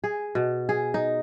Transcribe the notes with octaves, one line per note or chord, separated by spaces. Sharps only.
G#4
B2
G#4
D#4